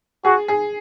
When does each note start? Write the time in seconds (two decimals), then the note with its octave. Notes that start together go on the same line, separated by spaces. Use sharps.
0.25 F#4 G#4
0.48 G#4